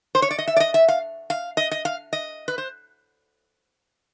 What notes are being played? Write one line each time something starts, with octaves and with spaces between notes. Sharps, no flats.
C5
C#5
D5
D#5
E5
D5
D#5
E5
F5
F5
D#5
D#5
F5
D#5
B4
C5